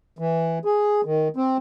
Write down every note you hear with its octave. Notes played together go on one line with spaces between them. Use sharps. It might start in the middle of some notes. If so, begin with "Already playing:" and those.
E3
G#4
D#3
C4